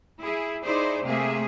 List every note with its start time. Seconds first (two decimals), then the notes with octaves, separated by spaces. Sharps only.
0.21 E4 G#4
0.63 D#4 E4 G#4 C5 D5
1.03 C3 A3 A#3 G#4 E5